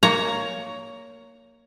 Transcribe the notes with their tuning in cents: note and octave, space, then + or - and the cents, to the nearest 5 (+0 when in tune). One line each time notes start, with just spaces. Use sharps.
A#3 -5 C#5 +15 A#5 +0